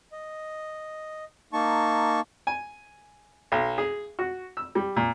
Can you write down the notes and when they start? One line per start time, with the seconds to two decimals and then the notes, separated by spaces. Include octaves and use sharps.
0.12 D#5
1.53 A#3 D#4 A5 C#6
2.47 G#5
3.52 B1
3.78 G#4
4.19 F#4
4.57 E6
4.75 G3
4.96 A#2